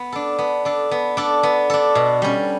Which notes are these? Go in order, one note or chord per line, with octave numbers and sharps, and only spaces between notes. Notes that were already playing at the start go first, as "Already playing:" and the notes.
Already playing: B3
D4 A4
B3
D4 A4
B3
D4 A4
B3
D4 A4
B2
G3 C#4